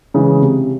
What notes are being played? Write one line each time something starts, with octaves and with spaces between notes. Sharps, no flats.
C#3 E3 G#3
C3